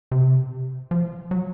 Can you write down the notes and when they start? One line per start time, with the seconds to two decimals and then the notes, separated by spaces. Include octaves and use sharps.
0.11 C3
0.91 F3
1.31 F#3